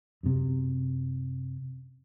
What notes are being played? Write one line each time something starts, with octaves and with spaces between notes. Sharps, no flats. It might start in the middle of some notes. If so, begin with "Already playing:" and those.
F#2 C3